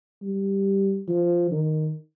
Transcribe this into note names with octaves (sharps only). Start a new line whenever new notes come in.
G3
F3
D#3